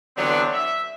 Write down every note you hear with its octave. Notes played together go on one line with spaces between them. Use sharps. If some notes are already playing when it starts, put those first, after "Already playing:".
D3 E3 F#3 B3 C4 D4
E5